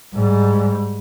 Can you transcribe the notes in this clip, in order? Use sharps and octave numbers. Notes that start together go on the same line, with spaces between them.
G#2 G3